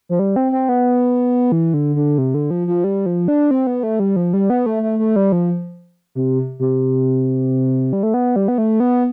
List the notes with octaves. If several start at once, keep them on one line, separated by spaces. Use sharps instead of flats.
F3
G3
C4
C4
B3
E3
D3
D3
C3
D3
F3
F3
G3
F3
D4
C4
B3
A3
G3
F3
G3
B3
A3
A3
A3
G3
F3
C3
C3
G3
A3
B3
G3
B3
A3
B3